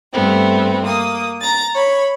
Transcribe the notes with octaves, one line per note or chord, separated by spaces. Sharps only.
G2 A3 B3 C4
A#3 D#6
A#5 A6
C#5 B5